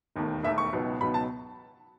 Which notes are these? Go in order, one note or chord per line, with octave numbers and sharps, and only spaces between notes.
E1 D#2 D#3 A3
E1 D#2 D#3 A3 E5
C#6
C#2 B2 F#3 B3 D#4
C#2 B2 F#3 B3 D#4 B5
A5